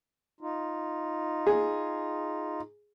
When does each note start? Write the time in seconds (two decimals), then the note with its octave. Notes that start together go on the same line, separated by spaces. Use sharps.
0.41 D#4 F4
1.47 G#4